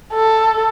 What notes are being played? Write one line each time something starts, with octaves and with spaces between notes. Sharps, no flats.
A4